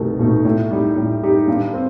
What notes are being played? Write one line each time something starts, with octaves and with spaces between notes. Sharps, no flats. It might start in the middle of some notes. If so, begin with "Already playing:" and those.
Already playing: C2 B2 A3 D#4
B2 A3 D#4
A2
G3 D#4 G4
A2
G3 D#4 G4
G2
C4